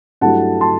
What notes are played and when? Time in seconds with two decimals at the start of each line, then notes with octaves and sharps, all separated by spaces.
0.21 G2 F#3 A3 E4 F#5 A5
0.61 A5 C6